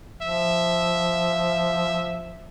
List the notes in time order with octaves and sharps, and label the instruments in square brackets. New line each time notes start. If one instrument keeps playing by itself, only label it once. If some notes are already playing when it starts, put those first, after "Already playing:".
[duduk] F3 [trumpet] E5